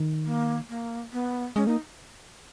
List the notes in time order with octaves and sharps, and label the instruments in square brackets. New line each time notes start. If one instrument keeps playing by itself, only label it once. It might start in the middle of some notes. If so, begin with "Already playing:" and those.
Already playing: [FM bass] D#3
[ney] A#3
A#3
B3
[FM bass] G#3 [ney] C#4
[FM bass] A#3 [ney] D#4